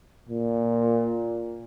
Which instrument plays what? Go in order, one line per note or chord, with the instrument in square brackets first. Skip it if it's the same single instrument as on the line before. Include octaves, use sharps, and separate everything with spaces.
[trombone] A#2